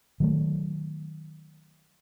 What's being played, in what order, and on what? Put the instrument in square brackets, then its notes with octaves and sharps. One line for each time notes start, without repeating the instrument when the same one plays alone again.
[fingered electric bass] D#3 F#3 A3